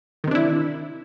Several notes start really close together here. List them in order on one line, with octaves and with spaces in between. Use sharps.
D#3 C3 D4 E4